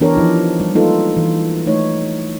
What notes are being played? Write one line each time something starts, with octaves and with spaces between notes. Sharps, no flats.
E3 B3 D4 G4 A#4 C#5
F3 D#4 E4
G3
G#3 A#3 D#4 F4 A4 B4
E3
A3 D#4 C#5